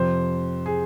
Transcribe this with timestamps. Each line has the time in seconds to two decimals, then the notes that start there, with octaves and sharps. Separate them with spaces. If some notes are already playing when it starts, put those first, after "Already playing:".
Already playing: F2 C3 F3 C5
0.66 G#4